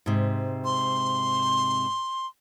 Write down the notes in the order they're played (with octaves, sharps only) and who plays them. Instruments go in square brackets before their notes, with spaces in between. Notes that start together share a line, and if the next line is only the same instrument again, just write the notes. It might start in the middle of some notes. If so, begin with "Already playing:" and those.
[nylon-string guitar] G#2 C3
[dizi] C6